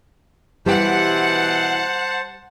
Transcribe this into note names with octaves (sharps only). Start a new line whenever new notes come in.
B2 E3 G3 G4 C5 F#5 G5 A5